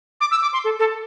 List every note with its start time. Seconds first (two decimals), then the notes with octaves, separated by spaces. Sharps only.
0.21 D6
0.31 E6
0.42 D6
0.53 C6
0.64 A4
0.80 A4